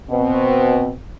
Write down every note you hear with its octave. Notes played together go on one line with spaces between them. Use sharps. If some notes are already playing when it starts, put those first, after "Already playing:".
B2 C4